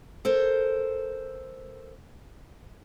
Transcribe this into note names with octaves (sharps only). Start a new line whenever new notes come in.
A4 A#4 C5